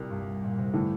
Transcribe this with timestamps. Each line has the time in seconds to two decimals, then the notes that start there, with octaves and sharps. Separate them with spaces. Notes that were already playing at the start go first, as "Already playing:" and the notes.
Already playing: C2 A#2 G3 A#3
0.10 G2
0.43 A#2
0.58 C3
0.73 A2 D3 E3 A3